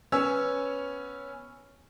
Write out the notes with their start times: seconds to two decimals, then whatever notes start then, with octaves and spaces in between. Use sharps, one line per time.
0.12 B3 C#4 C#5 E6